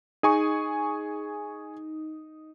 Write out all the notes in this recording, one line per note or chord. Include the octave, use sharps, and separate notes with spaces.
D#4 G#4 G#5 C#6